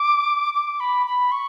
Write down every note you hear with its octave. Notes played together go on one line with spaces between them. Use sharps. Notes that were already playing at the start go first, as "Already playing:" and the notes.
Already playing: D6
D6
B5
B5
C#6